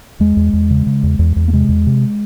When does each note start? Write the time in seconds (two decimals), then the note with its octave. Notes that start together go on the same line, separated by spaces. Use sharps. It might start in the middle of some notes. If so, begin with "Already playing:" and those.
0.20 E2 G#3
0.37 E2
0.53 E2
0.71 C#3
0.86 C#3
1.03 E2
1.19 E2
1.36 E2
1.48 A#3
1.53 C3 G#3
1.69 E2
1.87 C3